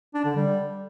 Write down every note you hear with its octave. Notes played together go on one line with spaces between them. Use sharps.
D4
D3
G3